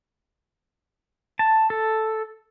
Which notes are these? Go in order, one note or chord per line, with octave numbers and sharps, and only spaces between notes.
A5
A4